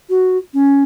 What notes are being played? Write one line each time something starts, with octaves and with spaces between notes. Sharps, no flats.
F#4
C#4